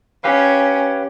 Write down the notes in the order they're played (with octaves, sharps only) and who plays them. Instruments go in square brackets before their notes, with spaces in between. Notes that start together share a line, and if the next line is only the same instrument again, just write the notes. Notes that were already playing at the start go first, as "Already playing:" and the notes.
[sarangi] C#4 [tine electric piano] G4 B4 F5